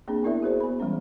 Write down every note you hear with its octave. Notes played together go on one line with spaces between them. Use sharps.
A#3 C4 D4 G#4
B3 C4 E4 A#4 D5 E5
F#4 G#4 C5 D5
B3 B5
E3 G3 G#3 C#4